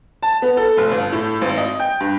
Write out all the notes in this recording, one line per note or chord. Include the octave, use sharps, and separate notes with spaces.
A5
B3
A4
F1
G1
A2
G#1
D#5
G5
G2